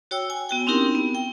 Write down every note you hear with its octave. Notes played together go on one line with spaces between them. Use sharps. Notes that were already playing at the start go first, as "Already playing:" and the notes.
F#4 C#5 G5 E6
G#5
B3 F#4 G5
C4 C#4 D#4 E4 G4 A#4
B3
G5